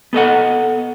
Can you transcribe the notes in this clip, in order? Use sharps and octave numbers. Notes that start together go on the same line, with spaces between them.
B3 A4 D#5 F#5